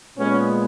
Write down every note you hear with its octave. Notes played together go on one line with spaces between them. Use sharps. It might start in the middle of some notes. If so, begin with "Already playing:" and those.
A#2 G#3 B3 C#4